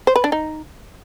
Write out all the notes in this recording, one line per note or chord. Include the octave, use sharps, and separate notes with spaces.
C5
B4
D4
D#4